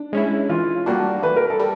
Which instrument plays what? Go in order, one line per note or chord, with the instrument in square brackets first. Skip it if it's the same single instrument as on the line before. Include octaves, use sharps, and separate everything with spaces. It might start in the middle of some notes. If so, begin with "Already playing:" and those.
Already playing: [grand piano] D4
[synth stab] G#3 C#4 E4
[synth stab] E3 [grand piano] F4
[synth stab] G3 A#3 D4 [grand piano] F#4
[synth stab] E3 [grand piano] B4
[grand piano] A#4
A4
[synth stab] G3